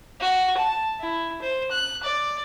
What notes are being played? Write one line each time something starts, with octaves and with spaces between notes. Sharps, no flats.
F#4
A5
E4
C5
F#6
D5